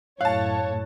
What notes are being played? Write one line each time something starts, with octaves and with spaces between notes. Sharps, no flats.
F#2 A2 C#5 F5 A5 F#6